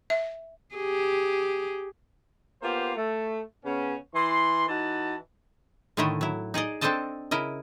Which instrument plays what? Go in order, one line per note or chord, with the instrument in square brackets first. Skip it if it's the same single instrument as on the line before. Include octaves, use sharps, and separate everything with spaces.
[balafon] E5
[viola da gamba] G4 G#4
[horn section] A#3 B3 F4 G4 C5
A3
C#3 B3 C#4
E3 C6
E3 D#4 F#4 A5
[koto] A2 D3 D#3 A3 E4 D#5
F#3 E4
D#4 G#4 D5 D#5
C4 D4 A4 C5 D#5 A5
C#3 E4 A#4 D#5